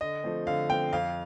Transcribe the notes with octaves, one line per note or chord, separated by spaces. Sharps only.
D3 D#5
F3 A3 C4
D3 F5
F3 A3 C4 G5
F2 F5